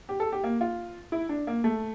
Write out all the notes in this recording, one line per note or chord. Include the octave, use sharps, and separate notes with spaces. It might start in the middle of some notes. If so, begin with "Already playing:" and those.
G4
A4
G4
A#3
F4
E4
D4
A#3
A3